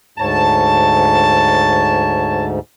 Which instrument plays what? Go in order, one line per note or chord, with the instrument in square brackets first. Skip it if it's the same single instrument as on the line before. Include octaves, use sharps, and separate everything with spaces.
[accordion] D2 G#2 [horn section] C#5 A5